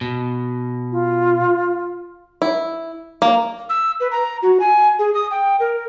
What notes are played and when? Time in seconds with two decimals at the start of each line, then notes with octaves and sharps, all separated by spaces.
0.01 B2
0.92 F4
2.42 E4
3.22 A#3
3.69 E6
4.00 B4
4.11 A#5
4.43 F#4
4.60 G#5
4.99 G#4
5.14 D#6
5.31 G5
5.60 A#4